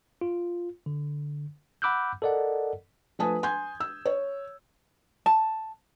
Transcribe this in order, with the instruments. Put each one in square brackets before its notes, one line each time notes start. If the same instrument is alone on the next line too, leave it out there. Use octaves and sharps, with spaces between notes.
[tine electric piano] F4
D3
F#5 B5 D6 E6 F#6 G6
A4 A#4 D5 D#5 F#5
[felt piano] F3 A3 B4 G#5 A5 D#6
G#5 C6 G6 G#6
E6
C#5
[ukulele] A5